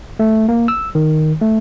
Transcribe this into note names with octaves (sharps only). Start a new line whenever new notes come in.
A3
A#3
E6
D#3
A3